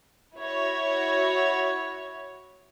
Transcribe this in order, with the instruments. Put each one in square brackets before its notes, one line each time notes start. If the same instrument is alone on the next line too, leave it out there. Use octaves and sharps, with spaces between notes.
[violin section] E4 F#4 C#5